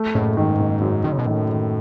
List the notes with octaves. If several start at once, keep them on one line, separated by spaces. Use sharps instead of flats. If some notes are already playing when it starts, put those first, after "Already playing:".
Already playing: A3
F#1 A2
G#2 D#3
F#1
F#2
F#1 D#3
C#3
B2
A2 D#3
D#3